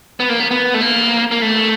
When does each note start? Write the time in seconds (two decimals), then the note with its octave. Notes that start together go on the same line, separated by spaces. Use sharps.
0.20 B3
0.29 A#3
0.40 B3
0.51 B3
0.74 A3
0.81 A#3
1.31 A#3
1.42 A3